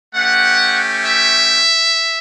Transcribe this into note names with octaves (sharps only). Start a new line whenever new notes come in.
A3 C#4 G4 F#5
E5